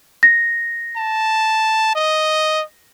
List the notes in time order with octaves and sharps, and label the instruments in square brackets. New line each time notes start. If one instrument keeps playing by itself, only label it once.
[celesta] A#6
[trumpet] A5
D#5